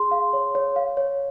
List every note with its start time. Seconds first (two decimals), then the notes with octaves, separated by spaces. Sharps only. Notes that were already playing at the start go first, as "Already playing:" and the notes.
Already playing: G#4 C6
0.11 F5
0.33 C#5
0.55 C#5
0.76 F5
0.97 C#5